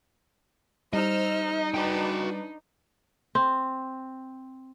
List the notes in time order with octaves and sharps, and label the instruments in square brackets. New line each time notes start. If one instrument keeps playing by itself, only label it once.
[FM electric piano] G3 [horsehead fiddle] D#4 [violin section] C5 E6 F6 [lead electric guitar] D#5
[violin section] D4 B4 D5 [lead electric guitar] F#4 G5
[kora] C4